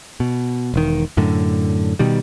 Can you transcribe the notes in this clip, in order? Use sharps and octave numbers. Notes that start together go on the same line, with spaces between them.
B2
E1 D#3
F#2 A2 D3
B2 D#3 G3